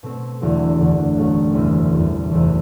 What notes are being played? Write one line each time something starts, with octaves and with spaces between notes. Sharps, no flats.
B2 A3 C4
E1 E2 D3 F#3 A3
F#1 E2 D3 A3
A1 A2 F#3 A3
F#1 E2 C3 G3 C4
E2 C3 G3
F#1 E2 C3